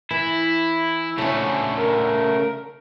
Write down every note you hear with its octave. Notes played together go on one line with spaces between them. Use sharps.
E3 E4
C#3 A3 C#4 D4
A#4